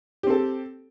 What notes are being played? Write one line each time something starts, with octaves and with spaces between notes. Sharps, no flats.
C4 G4 A4